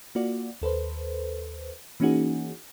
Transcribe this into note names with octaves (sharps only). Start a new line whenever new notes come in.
A#3 F4 F#4 D5
D#2 A4 B4 C5
E3 A#3 C#4 D#4 F#4 G#4